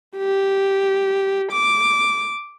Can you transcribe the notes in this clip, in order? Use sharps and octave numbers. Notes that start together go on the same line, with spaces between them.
G4
D6